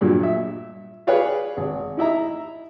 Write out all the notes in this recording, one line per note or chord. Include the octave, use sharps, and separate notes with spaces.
G2 A#2 F#3
E5
G#4 B4 C#5 D5 F5
G#1
D#4 E4 E5 A#5